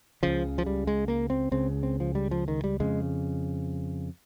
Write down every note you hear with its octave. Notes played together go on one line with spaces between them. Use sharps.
C#2 C#3 F3
F3
G3
G#3
A#3
C4
C#2 C#3 C4
C4
F3
G3
F3
D#3
G3
F2 C#3 G#3